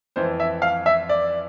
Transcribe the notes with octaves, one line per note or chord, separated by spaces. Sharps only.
F2 E3 C5
E5
F5
E5
D5